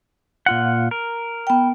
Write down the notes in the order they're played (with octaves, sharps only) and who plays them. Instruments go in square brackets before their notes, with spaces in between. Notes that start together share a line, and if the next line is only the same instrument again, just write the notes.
[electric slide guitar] A#2 F4 F#5
A#4
[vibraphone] B3 G5